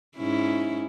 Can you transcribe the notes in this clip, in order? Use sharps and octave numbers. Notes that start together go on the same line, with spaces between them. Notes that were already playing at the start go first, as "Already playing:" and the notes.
G#2 C#4 E4